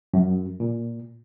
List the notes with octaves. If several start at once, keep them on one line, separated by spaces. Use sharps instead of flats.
F#2
A#2